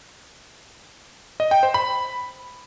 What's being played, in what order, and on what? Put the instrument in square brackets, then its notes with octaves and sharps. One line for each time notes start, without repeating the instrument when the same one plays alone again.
[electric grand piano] D#5
G5
C5
B5